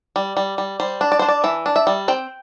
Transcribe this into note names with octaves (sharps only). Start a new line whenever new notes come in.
G3
G3
G3
G3 C5
D4
D5
D4 C5
D5
E3 E5
D4
E5
G3
C4 G5